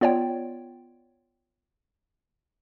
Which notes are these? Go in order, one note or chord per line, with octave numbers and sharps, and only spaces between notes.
B3 F4 C#5 D5 G5